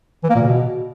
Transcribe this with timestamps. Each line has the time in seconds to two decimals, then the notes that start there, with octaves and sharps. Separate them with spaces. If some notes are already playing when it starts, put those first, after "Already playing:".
0.24 E3
0.30 A#3
0.36 A#2
0.42 C#3
0.48 B2